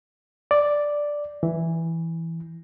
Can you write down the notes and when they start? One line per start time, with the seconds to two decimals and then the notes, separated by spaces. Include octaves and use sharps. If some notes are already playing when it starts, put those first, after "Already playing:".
0.51 D5
1.43 E3